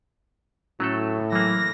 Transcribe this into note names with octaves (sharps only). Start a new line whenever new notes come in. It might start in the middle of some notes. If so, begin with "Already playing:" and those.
A2 F#3 A3 C#4 A4
E3 F#3 A#3 A#6